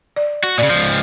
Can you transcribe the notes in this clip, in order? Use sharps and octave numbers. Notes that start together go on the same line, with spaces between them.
D5
F#4
A#2 C#3 D5
C#2 F3